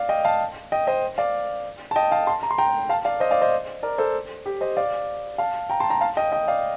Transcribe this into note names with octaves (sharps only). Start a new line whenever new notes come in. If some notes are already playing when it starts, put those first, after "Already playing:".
Already playing: D5 F5
D#5 G5
F5 A5
D#5 G5
C5 D#5
D5 F5
A5
D#5 G5
F5 A5
A5 C6
A#5
C6
G5 A#5
F5 A5
D5 F5
C5 D#5
D5 F5
C5 D#5
A#4 D5
A4 C5
G4
C5 D#5
D5 F5
F5 A5
G5 A#5
A5 C6
G5 A#5
F5 A5
D#5 G5
D#5 G5
D5 F5